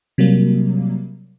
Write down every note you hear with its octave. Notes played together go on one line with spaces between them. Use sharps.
C3 F#3 G3 A#3